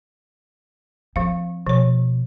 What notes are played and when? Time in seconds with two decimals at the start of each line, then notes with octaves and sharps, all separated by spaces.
1.16 F3 C4 F5
1.66 B2 F3 C#5